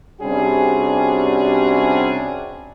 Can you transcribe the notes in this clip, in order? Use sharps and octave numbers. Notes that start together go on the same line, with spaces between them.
C3 G3 C#4 D4 F#4 G#4